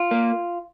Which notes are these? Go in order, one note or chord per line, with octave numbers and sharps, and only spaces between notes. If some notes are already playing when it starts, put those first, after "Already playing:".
Already playing: F4
A#3